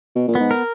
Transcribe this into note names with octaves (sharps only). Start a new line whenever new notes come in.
B2
A#2
G#2 B3
A#4